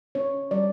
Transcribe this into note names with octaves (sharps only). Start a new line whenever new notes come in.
C#4 C#5
G3 D5